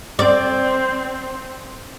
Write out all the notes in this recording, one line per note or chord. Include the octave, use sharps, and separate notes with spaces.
C4 D5